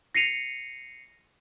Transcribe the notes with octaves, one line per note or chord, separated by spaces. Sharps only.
A#6 C7 C#7 D#7 F7